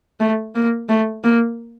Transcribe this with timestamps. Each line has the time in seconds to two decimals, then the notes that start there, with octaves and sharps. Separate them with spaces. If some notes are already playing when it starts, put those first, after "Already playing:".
0.20 A3
0.56 A#3
0.89 A3
1.24 A#3